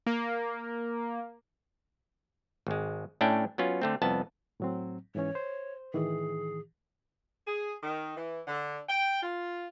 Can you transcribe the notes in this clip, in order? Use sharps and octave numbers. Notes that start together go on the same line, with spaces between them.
A#3
G#1 G#3
A2 C#4 D4 E5 G5
F#3 B3 C#4 F4
D3 A3 C4
C2 F2 B3 A5
A2 F#3 C4
G#2 E3 C#4 C#5
C5
A2 D#3 E3 G#4
G#4
D#3
E3
D3
G5
F4